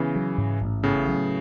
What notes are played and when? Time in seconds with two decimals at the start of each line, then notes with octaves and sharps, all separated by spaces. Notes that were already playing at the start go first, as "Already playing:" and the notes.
Already playing: C#3 E3 B3
0.16 F#3
0.38 G#2
0.61 A1
0.83 A2 C#3 B3
1.08 F#3